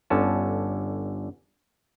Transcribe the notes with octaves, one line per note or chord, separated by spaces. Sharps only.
G1 D3 C#4 A5